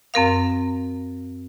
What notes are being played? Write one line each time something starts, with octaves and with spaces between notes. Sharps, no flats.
F#2 C4 A#4 F5